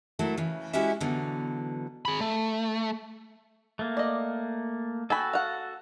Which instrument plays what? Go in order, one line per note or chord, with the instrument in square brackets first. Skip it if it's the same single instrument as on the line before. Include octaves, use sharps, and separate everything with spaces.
[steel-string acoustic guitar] F#3 A3 E4 A#4
C#3 E3
G#3 C#4 E4 F#4 G4 E5
B2 D3 E3 F#3
[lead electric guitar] G#4 B5
A3
[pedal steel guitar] A3 A#3
[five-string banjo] D5 D#5
[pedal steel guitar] F#4 A4 [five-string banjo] G5 G#5 B5
[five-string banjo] F5 F#5